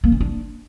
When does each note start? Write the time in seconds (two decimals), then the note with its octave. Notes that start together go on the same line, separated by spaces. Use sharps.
0.04 A#3
0.12 C#4
0.20 D4